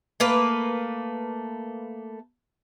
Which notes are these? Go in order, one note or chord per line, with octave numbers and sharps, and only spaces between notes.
A3 A#3 B4